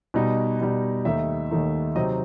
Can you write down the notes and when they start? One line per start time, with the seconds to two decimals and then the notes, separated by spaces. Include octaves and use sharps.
0.14 B2 G3 D#4
0.60 B2 G3 D#4
1.05 D#2 D#3 A3 D#4 E5
1.51 D#2 D#3 A3 D#4
1.96 C3 F#3 C4 D#4 D#5